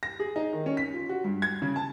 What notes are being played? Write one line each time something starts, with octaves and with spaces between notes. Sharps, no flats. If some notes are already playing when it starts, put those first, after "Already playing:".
A#6
G#4
D#4
D#3
C#4
B6
F4
F#4
G2
G#6
C#3
A5